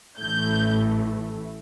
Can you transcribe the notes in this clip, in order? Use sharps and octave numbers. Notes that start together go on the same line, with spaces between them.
A1 A2 E3 A3 G6